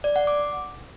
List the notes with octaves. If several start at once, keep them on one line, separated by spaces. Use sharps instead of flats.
D5
F#5
D6